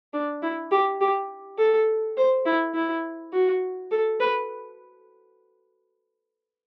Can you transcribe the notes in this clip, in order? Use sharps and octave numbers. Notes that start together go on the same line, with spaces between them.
D4
E4
G4
G4
A4
C5
E4
E4
F#4
A4
B4